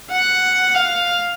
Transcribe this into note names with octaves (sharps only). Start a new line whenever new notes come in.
F#5
F5